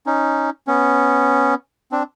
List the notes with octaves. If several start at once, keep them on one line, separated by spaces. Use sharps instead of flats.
C#4 D#4
B3 C#4
C4 D4